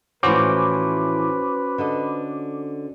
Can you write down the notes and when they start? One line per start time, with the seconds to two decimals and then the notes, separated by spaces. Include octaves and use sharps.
0.23 A2 E3 F3 C#4 F#4 B4 C5 D6
1.78 D3 A4 D#5